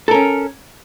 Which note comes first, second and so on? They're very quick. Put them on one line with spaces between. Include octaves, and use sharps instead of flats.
A4 A#4 C#4